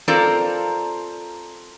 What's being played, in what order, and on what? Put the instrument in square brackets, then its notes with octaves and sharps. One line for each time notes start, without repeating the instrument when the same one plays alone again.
[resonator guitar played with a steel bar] C4 F4 A4 A#4 D5 A#5